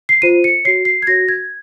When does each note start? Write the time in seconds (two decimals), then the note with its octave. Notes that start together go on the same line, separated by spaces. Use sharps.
0.09 C7
0.22 F4 C5 D#7
0.44 C#7
0.65 F#4 C#5 C7
0.85 C7
1.02 G#6
1.07 F#4 C#5 A#6
1.29 G#6